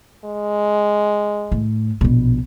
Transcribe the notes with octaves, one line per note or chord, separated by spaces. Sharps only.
G#3
A2
A#1 B2